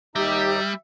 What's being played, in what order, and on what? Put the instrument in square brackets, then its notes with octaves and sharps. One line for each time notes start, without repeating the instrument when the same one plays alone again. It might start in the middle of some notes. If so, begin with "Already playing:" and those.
[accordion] D#2 D#4 A#5 [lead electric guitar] G3 [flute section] G4 [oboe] E5